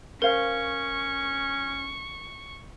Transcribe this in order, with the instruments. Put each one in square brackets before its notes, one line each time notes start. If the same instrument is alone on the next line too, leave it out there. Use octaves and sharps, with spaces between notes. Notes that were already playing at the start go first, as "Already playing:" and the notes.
[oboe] C#4 [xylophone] A#4 [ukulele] C5 F5 [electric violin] C#6